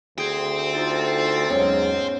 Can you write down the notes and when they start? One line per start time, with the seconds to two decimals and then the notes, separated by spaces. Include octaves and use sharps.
0.18 D2 G#4 C5 G5
0.73 D#4 F4 A4
1.50 E2 G#2 F#3 B3 C#4